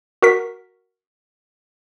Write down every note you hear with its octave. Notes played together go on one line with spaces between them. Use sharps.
F#4 A#4 B6